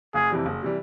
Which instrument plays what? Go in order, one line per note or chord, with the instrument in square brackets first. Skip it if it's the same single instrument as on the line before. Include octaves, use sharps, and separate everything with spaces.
[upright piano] F#1 [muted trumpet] G#4
[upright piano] F2 C3 E3 G3
F#1
C3 E3 G3